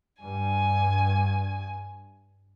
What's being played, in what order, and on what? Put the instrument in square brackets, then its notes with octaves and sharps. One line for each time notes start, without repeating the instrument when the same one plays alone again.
[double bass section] G2 [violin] G#5